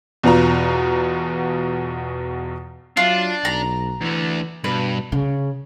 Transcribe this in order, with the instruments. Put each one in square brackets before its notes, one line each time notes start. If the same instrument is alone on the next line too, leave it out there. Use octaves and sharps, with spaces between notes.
[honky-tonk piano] E2 B2 B3 F4 A#5
[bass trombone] F#3 [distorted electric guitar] D4 [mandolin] F4
[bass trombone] B1 [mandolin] A#5
[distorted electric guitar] D2 D3 [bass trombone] E3
[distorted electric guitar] G2 [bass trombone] B2 [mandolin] B4
[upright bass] C#3